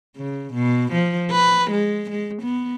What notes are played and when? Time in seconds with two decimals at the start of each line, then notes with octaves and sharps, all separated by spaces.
0.17 C#3
0.54 B2
0.93 F3
1.31 B4
1.71 G#3
2.10 G#3
2.42 B3